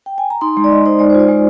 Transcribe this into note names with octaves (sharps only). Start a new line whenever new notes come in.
G5
G#5
A#5
D#4 C6
G#3
D5
G#3 D#5
D#4 C5
G#3 D5
C5
F4
D5
G#3